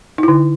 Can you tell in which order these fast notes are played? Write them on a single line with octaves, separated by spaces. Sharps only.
D#4 E4 D3